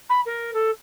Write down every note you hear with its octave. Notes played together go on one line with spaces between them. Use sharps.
B5
A#4
A4